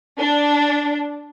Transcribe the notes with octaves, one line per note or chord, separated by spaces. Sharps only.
D4